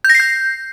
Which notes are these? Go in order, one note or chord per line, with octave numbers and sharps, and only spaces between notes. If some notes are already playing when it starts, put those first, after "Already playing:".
G6
A#6
C7
G6